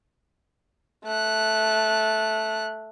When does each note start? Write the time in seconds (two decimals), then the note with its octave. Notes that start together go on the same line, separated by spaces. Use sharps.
1.04 A3 F#6